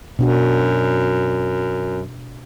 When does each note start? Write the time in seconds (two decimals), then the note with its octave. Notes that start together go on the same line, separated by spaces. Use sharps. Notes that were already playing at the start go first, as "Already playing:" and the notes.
0.19 F#2 B2 D4 F#4